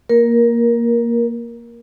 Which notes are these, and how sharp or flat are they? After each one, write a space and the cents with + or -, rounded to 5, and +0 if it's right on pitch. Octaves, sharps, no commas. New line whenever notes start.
A#3 +0 A#4 +15